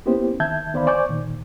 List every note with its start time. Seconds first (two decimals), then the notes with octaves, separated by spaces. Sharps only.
0.06 A#3 B3 C#4 E4 G4 C5
0.40 D#3 E5 A5 G6 G#6
0.74 D#3 B3 C5 D5 F5 B5
0.87 C5 D5 G#5 C#6 D6 G6
1.09 A#2 D#3